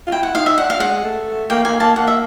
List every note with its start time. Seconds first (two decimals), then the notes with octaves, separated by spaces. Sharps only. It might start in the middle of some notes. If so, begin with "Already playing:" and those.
0.07 F4
0.12 E4 G5
0.23 F#5
0.35 D#4 F5
0.46 E5
0.58 D4 F#5
0.70 F5
0.80 G#3 F#5
1.04 A3
1.50 A#3 G5
1.65 A#3 G#5
1.80 A#3 A5
1.96 A#3 F#5
2.08 E5